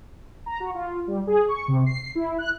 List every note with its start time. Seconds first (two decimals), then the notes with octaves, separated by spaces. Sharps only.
0.46 A#5
0.60 F#4
0.75 F4
1.07 G3
1.27 G#4
1.48 C#6
1.68 C3
1.86 C7
2.15 E4
2.38 F#6